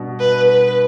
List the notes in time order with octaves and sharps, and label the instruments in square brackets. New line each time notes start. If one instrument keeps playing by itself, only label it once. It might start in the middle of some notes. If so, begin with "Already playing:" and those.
Already playing: [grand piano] G2 B2
[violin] B4
B4